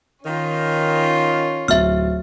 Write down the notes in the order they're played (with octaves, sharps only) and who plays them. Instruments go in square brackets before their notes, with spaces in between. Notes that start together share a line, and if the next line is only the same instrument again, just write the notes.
[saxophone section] D#3 [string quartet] C#4 F4
[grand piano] D1 A6 [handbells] E5 F6